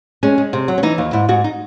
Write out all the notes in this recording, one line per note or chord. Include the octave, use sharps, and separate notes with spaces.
G#3 C#4
G#3
C3
F#3
C#4
E3 D#4
D#2
G#2 E4
G#2 F#4
D#4